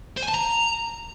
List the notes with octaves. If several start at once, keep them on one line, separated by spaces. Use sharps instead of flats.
C5
G#5
A5
A#5